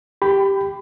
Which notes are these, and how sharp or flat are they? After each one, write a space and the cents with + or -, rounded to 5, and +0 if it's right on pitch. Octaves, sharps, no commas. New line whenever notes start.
G4 +0 B5 +25